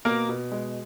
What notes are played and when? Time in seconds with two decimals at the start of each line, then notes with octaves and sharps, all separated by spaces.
0.05 B2 A#3 A#4
0.29 B2
0.51 G#3